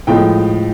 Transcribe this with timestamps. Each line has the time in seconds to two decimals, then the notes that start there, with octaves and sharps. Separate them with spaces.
0.07 A2 F3 G#3 G5